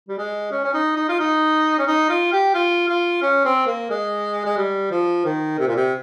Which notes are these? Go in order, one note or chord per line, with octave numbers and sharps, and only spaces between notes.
G3
G#3
C#4
C#4
D#4
D#4
F4
D#4
C#4
D#4
F4
G4
F4
F4
C#4
C4
A#3
G#3
G#3
G3
F3
D#3
C3
A#2
C3